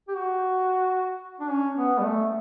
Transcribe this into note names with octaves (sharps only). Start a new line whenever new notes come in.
G4
F#4
D4
C#4
B3
G3
A3